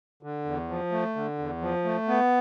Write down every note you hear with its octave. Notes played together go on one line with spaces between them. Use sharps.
D3
E2
F3
A3
D3
E2
F3
A3
B3